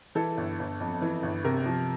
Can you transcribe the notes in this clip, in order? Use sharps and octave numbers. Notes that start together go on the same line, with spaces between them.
E3 A4
G1
G1
F2
E3
G1
C3 A#4
F3